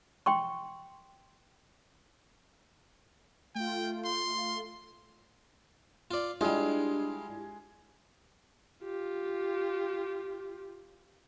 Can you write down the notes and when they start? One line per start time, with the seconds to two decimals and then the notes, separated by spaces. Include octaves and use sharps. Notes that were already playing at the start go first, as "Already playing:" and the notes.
0.26 G5 C6 C#6
3.55 A3 F4 G5
4.05 C6
6.11 F4 D5
6.41 G3 G#3 D4 E4 F4 G4
8.83 F4 G4